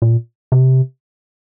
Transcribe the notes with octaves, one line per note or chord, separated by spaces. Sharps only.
A#2
C3